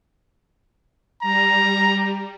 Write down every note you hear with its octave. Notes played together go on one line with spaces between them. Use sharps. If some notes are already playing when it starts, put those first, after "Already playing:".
G3 A#5